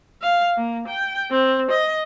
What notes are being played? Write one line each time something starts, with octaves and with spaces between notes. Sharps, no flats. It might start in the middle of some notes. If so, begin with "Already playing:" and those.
F5
A#3
G5
C4
D#5